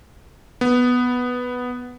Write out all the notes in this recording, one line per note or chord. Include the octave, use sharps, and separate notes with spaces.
B3